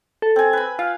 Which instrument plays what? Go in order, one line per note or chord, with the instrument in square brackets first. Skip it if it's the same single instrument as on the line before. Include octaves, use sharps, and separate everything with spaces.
[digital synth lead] A4
[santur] C4 G#5
B4 B5
[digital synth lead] F4 [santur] F5